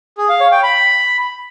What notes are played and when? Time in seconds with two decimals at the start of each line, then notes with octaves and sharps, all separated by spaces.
0.18 G#4
0.29 F5
0.40 C#5
0.52 G5
0.63 B5